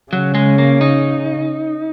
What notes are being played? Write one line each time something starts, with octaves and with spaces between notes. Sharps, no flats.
C#3 F#3
G#3
A#3
D#4